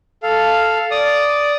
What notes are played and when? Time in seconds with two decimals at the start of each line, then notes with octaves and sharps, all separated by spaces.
0.23 A4 F5
0.91 D5 D#6